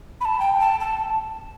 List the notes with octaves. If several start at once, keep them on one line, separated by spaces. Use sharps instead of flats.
B5
A5
G5
A5
A5